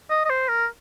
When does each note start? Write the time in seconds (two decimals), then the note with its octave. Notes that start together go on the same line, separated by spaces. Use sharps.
0.10 D#5
0.25 D#5
0.30 C5
0.49 A#4